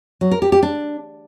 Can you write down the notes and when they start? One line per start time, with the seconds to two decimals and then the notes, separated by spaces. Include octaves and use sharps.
0.21 F#3
0.31 A#4
0.42 G4
0.52 G4
0.63 D4